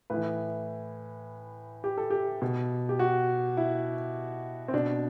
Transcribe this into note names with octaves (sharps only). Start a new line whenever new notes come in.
A2 E3 B4
G4
A4
G4
B2
G4
F#4
E4
C4
B2 D4